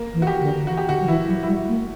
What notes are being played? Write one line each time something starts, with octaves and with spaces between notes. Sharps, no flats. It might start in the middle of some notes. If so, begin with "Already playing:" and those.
Already playing: A#3
E3
F#4
G4
D3
E3 F#4
G4
D3 F#4
F#3
E3 E4
F#3
E4
G3 F#4
A#3